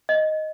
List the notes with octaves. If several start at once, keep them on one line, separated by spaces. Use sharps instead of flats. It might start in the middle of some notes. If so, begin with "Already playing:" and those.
D#5